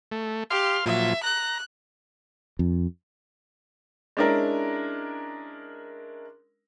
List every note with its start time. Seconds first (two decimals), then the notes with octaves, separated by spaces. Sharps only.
0.12 A3
0.50 G4 F5 C6 F6
0.86 A#2 F3 F#3 E5
1.23 A#5 F#6
2.59 F2
4.17 G#3 C#4 D4 E4 A#4